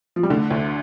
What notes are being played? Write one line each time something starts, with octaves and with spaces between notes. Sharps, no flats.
F3
G3
D3 A3
D2